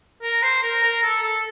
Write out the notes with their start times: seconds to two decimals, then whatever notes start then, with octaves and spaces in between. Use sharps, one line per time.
0.23 A#4
0.43 C5
0.62 A#4
0.83 A#4
1.03 A4
1.23 A4